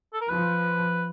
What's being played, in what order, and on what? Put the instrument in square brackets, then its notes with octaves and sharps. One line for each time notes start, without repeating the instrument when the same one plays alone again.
[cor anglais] A4
A#4
[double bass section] F3 [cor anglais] B4